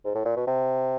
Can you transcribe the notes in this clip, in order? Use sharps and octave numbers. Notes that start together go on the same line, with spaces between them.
G#2
A2
A#2
B2
C3